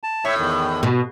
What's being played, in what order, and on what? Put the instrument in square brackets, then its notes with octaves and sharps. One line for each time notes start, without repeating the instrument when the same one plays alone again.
[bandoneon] A5
[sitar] A2 [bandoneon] C#5 E5 C#6
[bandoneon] E2 D#3
[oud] B2